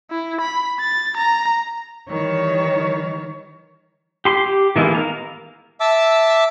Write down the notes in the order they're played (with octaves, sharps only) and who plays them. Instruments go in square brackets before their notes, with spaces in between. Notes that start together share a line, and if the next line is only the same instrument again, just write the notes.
[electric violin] E4
B5
A6
A#5
[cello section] D#3 E3 G3 C#5
[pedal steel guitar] G4 C6
G4
D#3 E3 G#3 A#3 B3
F5 A#5
[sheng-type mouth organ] E5 A5 D6 E6